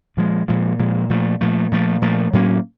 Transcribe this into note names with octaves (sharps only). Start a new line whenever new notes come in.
A#2 F3 G#3
A#2 F3 G#3
A#2 F3 G#3
A#2 F3 A3
A#2 F3 A3
A#2 F3 A3
A#2 F3 A3
A2 F#3 A#3 C#4